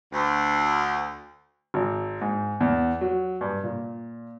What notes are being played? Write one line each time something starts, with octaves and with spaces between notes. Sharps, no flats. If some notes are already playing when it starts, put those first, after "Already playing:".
D2
G#1
G#2
E2
F#3
G2
A#2